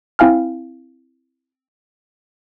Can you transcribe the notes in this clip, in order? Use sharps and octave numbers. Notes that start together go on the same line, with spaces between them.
C4 E4 F5 G#5 F6